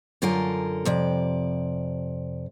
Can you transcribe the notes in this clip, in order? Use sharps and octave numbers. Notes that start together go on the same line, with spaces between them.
F#2 D3 F4 A4 A#4 G#5
F2 C3 D5